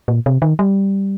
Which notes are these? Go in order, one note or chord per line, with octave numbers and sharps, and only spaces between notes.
A#2
C3
D#3
G3